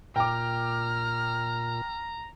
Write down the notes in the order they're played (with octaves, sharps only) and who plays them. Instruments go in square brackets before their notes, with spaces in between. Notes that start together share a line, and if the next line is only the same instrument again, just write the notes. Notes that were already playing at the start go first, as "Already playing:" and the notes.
[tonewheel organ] A#2 [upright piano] G5 D6 [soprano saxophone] A#5 [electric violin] F6